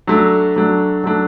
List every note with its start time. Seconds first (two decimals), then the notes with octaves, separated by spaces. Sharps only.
0.07 F#3 A3 D4
0.56 F#3 A3 D4
1.04 F#3 A3 D4